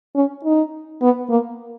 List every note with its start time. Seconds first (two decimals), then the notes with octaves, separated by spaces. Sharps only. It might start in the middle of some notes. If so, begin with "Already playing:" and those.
0.15 C#4
0.44 D#4
1.02 B3
1.30 A#3